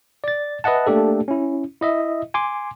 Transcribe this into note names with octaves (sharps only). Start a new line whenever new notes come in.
D5 A6
B4 D#5 E5 F#5 A5
A3 A#3 D4 G4 A4
C#4 E4
E4 D#5 E5
G#5 C6 D6